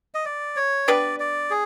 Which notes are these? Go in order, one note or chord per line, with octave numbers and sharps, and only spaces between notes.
D#5
D5
C#5
B3 D4 G4 B4 D5
D5
G#4